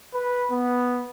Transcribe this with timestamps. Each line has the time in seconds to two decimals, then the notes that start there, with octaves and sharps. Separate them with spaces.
0.14 B4
0.52 B3